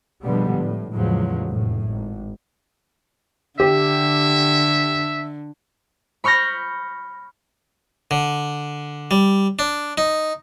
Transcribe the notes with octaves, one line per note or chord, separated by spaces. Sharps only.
B2 D3 F3 G3 G#3 B3
A2
E2 A2 C#3 F3 F#3 G#3
F1 A2
G#1
D3 G4 E5
B5 C#6 F6 G6 A#6
D3
G3
D4
D#4